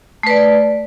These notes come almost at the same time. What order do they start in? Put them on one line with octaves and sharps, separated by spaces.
A3 B4 D5